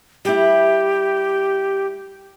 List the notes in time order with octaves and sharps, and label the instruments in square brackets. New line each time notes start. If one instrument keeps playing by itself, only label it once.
[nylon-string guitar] G3 E4 [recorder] G4